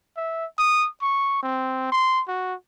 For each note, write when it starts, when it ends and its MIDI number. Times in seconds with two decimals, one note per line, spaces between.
0.17 0.46 76
0.59 0.88 87
1.02 1.38 85
1.43 1.87 60
1.92 2.22 84
2.28 2.55 66